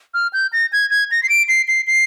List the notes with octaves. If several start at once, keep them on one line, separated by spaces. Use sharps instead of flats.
F6
G6
A#6
G#6
G#6
A#6
C7
D7
C7
C7
C7